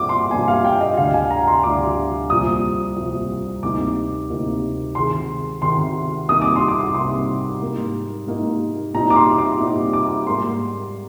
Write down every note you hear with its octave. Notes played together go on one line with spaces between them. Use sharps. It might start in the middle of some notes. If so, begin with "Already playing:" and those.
Already playing: G2 F3 A#3 D4 D6
C6
G2 F3 A#3 D4 G#5
F5
G5
D#5
D2 D3 G3 D4 F5
G#5
A#5
C6
D2 D3 G3 D4 D6
C2 A#2 F3 D#6
C2 A#2 F3
D2 C3 G3 A#3 D#4 D6
D2 C3 G3 A#3 D#4
C3 D#3 G#3 C6
C3 D#3 G#3 C6
C2 C3 G3 A#3 D#4 D#6
D6
C6
D6
C2 C3 G3 A#3 D#4 C6
G#2 G3 A#3 D#4
G#2 G3 A#3 D#4
A#2 G3 C4 D#4 A#5
D6
C6
D6
A#2 G3 C4 D#4
D6
G#2 G3 A#3 C6